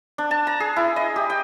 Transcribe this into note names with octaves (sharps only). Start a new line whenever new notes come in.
D4
A5
A#5
G#4
E4
D#5
G4
G5